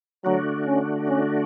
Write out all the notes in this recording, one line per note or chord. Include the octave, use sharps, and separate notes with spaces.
D3 F#3 A3 D4 F#4
C#4
C#4